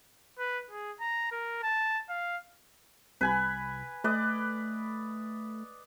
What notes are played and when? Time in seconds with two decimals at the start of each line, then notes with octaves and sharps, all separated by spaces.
0.38 B4
0.71 G#4
1.00 A#5
1.32 A#4
1.63 A5
2.09 F5
3.21 C2 B4 G#5 B5
4.04 A3 B4 D5 D#5